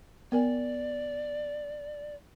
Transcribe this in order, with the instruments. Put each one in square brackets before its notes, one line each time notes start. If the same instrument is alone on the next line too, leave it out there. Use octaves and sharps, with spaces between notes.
[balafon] B3 A#4 G#5 [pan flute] D5